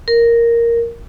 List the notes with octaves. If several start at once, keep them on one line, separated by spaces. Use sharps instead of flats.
A#4